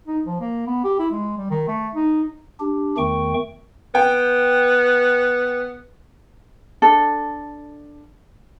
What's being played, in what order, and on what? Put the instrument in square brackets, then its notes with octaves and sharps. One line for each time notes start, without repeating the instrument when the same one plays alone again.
[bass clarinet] D#4
F3
A#3
B3
G4
E4
G#3
G3
D#3
A3
D#4
[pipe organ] D4 G4
E2 D#3 A3 G5 C#6
[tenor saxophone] B3 [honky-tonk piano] G5
[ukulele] D4 A4